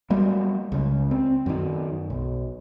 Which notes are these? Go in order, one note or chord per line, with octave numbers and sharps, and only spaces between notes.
F#3 G3 A#3
C#2 C#3
C4
F#2 D#3
B1